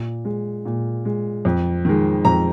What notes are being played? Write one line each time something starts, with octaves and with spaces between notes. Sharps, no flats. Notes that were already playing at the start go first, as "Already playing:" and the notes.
Already playing: A#2
G#3
A#2
G#3
F2
D#3 G#3
F2 A#5